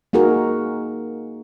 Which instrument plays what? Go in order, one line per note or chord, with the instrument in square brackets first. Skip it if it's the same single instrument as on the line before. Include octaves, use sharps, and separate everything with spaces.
[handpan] A#3 D#4 F#4 G#4 A#4